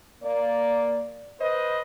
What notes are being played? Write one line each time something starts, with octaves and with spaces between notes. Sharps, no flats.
A#3 D5
B4 C5 D#5